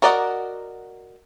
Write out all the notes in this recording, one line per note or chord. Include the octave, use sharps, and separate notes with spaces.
F#4 A#4 D5 D#5 F#5